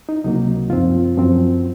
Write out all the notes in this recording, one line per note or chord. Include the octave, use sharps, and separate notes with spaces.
D#4
C#2 C3 F#3 A#3 D#4
F#2 F3 C4 F4
F#2 F3 C4